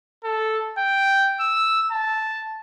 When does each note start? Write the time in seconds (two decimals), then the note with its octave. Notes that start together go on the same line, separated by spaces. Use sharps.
0.24 A4
0.78 G5
1.40 E6
1.92 A5